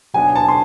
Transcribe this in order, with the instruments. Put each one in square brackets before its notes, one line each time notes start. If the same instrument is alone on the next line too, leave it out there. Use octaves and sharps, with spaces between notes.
[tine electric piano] B2 F#3 B3 D4 [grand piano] G#5
[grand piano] A5
C6